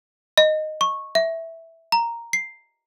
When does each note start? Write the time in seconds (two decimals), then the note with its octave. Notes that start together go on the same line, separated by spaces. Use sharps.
0.38 D#5
0.81 C#6
1.15 E5
1.92 A#5
2.33 C7